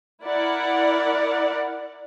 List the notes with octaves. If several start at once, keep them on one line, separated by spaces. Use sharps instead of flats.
E4 A#4 D5 F#5